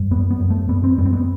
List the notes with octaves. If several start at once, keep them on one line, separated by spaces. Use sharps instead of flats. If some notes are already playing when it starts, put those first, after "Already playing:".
Already playing: G2
F#2 B3
B3
F#2
A3
F#2 B3
C4
F#2 B3
C4
B3